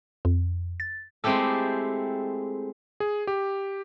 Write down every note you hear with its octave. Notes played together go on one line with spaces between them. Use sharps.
F2
A6
G#3 A3 C4 E4 G4 A4
G#4
G4